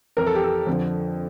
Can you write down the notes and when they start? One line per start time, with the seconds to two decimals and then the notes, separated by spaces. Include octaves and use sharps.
0.17 F2 E3 A#4
0.27 A4
0.35 G4
0.44 A4
0.67 F2 D3 F3